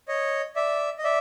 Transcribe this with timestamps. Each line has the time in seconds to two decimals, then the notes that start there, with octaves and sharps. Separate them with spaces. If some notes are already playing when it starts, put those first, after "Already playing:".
0.08 C#5 D#5
0.55 D5 E5
0.98 D#5
1.04 D5 E5